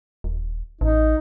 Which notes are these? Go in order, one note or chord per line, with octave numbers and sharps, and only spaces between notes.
D#1
A1 D#4